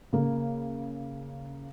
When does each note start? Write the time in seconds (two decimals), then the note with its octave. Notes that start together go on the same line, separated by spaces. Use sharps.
0.13 C#3 A#3